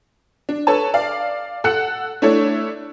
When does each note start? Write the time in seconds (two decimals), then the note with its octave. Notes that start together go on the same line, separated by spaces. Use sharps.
0.49 D4
0.67 A4 B4 C#5 A5
0.94 D5 F5
1.64 A4 F#5 F#6 C#7
2.22 A3 D4 E4 A4 C#5